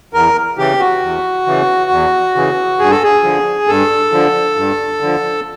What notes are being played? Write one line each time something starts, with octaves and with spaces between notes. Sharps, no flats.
E2 A#4
C#3 E3 G4
F#4
E2
C#3 E3
E2
C#3 E3
G2 G#4
A4
G#4
D3 F3
G2 A4
D3 F3
G2
D3 F3